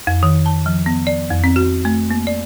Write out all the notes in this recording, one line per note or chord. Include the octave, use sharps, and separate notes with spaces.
F2
D#3
A5
F3
B3
D5
F2
C4
F#4
A3
A#3
D5